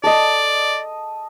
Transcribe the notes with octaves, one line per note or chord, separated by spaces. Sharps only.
A4 D5 D#5